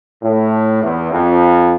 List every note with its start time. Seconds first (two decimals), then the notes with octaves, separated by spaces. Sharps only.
0.22 A2
0.82 E2
1.11 F2